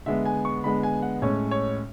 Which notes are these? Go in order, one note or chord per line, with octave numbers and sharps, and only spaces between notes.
D3 G#3 B3 E5
G#5
C#6
D3 G#3 B3 B5
G#5
F#5
A2 G#3 C#4 C#5
C#5